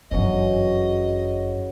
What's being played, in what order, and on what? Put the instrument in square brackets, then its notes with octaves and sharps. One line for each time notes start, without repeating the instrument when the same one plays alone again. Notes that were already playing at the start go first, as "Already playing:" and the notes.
[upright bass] G1 F#2 [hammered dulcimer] C#3 E3 F#3 [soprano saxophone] D#5